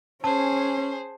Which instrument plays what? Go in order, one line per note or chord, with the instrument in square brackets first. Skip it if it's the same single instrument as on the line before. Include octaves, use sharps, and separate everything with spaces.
[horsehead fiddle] C#4 [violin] G#4 C5 [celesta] A5